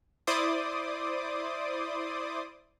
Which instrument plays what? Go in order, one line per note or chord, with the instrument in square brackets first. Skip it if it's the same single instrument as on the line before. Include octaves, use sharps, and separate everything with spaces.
[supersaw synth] E4 C5 D5 C6 D6 D#6